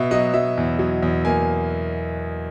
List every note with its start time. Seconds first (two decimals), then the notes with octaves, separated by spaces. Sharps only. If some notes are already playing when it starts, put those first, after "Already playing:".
Already playing: B2 E5
0.11 F#3 D#5
0.34 F#3 E5
0.57 E2
0.79 F#3
1.02 E2
1.25 A#3 G#5